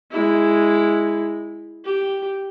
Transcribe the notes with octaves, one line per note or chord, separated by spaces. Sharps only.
G#3 E4
G4